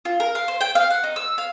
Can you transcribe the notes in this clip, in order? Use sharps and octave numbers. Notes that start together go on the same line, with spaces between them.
F4
A#4
F5
C5
G5
F5
F#5
D#4
E6
F5